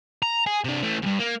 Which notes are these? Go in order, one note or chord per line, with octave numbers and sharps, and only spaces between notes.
A#5
G#4
C3 D4
E3 A3
E2 G2
A#3